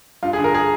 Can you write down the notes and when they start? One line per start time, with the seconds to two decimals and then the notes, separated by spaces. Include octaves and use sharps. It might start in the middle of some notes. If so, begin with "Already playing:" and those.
0.23 G2 F4
0.33 G#4
0.39 D3
0.44 A#4
0.54 G#4